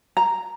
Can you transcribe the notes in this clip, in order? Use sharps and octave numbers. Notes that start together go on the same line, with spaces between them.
A#5